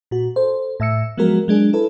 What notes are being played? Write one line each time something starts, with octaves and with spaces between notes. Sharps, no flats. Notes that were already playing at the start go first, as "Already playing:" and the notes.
A#2 F#4
A4 C5
A2 E5 E6 C#7
F3 F#3 G#3 B3 F#4 A#4
F#3 G#3 D4 G#4
E4 A4 B4